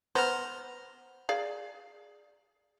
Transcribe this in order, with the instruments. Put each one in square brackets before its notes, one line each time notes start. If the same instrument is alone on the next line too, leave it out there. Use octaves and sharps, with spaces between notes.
[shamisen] B3 [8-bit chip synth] C5 A#5 F6
[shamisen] G#4 D5 F5